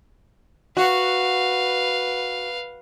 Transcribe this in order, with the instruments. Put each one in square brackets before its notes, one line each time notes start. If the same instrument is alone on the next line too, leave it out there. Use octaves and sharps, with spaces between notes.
[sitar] F#4 [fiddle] B4 F5